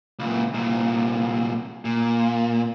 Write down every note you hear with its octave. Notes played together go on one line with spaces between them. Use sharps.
C#2 A#2
C2 A#2
A#2